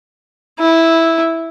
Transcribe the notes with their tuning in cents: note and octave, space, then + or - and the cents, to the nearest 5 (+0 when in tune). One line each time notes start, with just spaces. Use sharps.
E4 -5